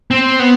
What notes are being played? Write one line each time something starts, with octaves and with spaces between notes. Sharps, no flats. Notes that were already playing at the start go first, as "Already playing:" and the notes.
C4
B3